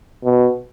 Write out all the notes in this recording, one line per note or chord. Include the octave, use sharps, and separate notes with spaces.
B2